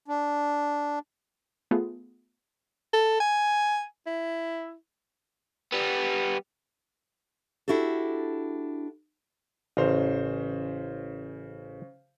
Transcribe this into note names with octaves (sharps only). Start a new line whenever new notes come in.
D4
A3 B3 F4 G#4
A4
G#5
E4
G3 B3
D4 E4 F#4 G4 A4
A1 C#3 C5 A#5